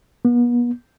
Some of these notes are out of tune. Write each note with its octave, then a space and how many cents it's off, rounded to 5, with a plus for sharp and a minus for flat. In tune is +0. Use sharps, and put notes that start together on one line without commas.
B3 -40